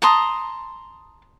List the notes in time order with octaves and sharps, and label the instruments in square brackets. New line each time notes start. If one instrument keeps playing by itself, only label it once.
[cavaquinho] A5 A#5 C6 D#6